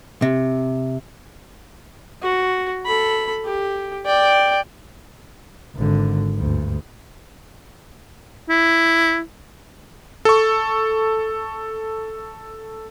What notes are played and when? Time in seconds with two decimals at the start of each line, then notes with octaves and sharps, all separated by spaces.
0.22 C3
2.22 F#4
2.86 A4 B5
3.45 G4
4.06 D5 G5
5.76 G#1 D3
6.35 D2 G2
8.49 E4
10.25 A4 C#6